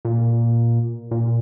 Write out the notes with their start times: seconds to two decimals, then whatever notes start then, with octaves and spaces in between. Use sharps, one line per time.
0.05 A#2
1.11 A#2